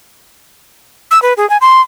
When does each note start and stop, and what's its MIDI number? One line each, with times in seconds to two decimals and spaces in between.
1.11 1.21 88
1.22 1.33 71
1.37 1.48 68
1.50 1.57 80
1.61 1.81 84